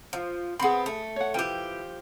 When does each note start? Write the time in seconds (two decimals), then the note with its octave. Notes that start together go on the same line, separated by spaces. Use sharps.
0.13 F3
0.59 B3 C4 G#4 B5
0.86 A3
1.16 C#5 F#5
1.34 F3 E4 G4 B4 G5